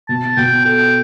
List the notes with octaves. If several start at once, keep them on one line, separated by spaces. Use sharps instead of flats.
B2 A5
B2 G5
A4 G5